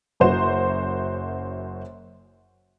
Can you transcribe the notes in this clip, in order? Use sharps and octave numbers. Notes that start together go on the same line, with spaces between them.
F#1 F#2 F#4 C5 E7